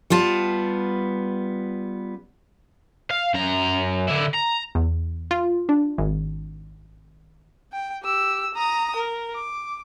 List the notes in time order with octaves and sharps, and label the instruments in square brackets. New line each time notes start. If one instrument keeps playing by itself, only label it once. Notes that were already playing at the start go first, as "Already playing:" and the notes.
[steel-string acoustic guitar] G3 B3 F4 A5
[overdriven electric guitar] F5
F#2 A#5
D3 E4
A#5
[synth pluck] E2
F4
D4
G#1
[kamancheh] G5
G4 E6
A#5 D#6
A#4
D6